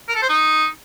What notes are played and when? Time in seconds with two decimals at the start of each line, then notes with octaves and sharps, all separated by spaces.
0.09 A#4
0.15 A4
0.22 C5
0.29 D#4